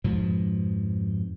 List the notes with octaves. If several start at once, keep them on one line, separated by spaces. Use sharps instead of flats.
F2 G#2 B2 F3